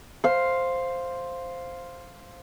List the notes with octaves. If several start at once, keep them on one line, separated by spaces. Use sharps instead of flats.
C5 F5